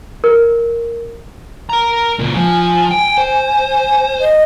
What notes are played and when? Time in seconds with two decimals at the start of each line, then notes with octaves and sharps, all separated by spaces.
0.24 A#4
1.70 A#4 A#5
2.19 C#2 A#2
2.35 F3 G#5
2.91 G5
3.18 C5
4.20 D#5